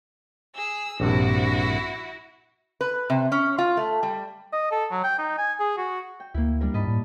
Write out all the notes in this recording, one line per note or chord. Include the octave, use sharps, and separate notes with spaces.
G#4 E6
A#1 G2 C3 E4 F#4
B4
C3
C#4
F4
A3
G3
D#5
A4
F#3
G5
D#4
G#5
G#4
F#4
G5
D2 A#3 E4
G3 D4 A#4
G#2 D#5 A5 B5
A2